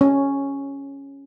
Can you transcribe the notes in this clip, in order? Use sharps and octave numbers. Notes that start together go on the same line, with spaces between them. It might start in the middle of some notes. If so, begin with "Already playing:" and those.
C#4